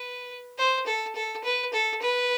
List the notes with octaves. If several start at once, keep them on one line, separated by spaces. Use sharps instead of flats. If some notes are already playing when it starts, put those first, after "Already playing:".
Already playing: B4
C5
A4
A4
B4
A4
B4